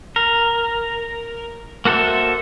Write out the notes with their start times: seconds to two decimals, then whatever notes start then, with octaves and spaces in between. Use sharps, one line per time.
0.16 A#4
1.85 A#3 F#4 A4 C5 E5